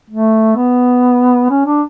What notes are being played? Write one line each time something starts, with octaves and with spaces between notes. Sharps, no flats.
A3
B3
C#4
D4